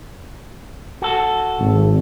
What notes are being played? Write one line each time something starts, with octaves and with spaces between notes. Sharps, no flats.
F#4 A4
G#1